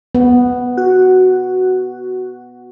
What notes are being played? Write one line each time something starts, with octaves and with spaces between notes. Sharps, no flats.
B3
F#4